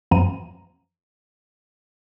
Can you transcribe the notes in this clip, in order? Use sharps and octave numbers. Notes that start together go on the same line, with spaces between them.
F#2 E3 F3 A#5 D#7